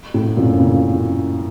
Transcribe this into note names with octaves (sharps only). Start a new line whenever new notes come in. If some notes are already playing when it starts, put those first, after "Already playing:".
A2
F#2 A#2
A#2 C#3